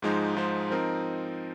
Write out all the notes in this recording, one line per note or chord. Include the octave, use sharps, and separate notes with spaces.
G#2 F3 G#3 D#4 C5
G#2 F3 G#3 D#4 C5
F3 C4 D#4 A#4